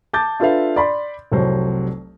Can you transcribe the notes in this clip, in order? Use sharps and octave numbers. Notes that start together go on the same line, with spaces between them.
A5 D6 G6 A6
D4 F4 A4 B4 E5 F5
D5 B5 C6
F1 C2 F#3 C5